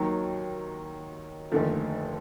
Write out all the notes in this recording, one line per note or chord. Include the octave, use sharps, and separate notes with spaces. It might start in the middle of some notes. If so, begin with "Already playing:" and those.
Already playing: D#2 D#3 F#3
F1 D#2 D3 F3 A3